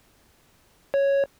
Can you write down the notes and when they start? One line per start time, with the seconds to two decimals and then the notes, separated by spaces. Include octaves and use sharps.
0.94 C#5